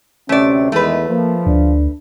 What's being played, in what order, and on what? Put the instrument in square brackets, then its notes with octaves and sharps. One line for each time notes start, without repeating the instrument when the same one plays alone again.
[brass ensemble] D2 C3 [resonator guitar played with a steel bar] A3 D5 [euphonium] C#4
[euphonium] E2 [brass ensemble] D#3 G#3 [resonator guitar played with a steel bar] A3 B4
[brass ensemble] F3 [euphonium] A#3
[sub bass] D2 [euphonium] D4